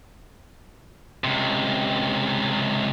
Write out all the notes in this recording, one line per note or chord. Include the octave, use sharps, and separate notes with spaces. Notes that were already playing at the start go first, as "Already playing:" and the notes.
C#2 C3